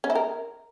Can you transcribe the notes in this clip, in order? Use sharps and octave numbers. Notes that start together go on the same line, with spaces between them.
C#4
E4
A#4